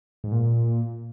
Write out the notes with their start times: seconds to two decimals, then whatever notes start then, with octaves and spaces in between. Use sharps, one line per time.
0.24 G#2
0.32 A#2